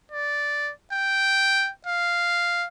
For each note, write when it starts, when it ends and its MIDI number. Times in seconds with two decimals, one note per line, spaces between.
0.12 0.71 74
0.93 1.70 79
1.87 2.67 77